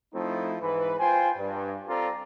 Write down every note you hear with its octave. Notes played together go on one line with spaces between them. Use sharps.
F3 A3 C4 D#4 E4
G#2 E3 B4
F4 C5 G5 G#5
G2
C4 F4 A4 D5 A#5